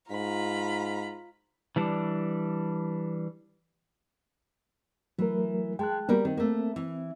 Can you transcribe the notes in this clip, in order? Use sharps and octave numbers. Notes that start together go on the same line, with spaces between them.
G#2 F4 A#5 B5
E3 G3 D4
E3 F#3 A3 A#4
G#3 G5 A5 F#6
G3 A#3 B3 F#4 G4 A#4
D#3 C4
A3 A#3
E3